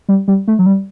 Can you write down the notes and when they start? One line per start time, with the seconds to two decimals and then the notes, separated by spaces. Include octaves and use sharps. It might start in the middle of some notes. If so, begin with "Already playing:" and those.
0.09 G3
0.28 G3
0.48 A3
0.59 F#3
0.66 G3